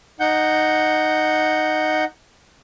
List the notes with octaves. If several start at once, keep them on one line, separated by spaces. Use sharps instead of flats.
D#4 F#5 G6